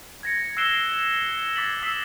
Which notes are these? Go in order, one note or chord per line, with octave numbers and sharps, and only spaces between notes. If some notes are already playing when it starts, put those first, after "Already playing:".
G#6 A#6 C#7
E6 F#6 C7 D7 E7 G7
D6 G#6 A6 B6 C7 F#7
D#6 E6 B6 C7 E7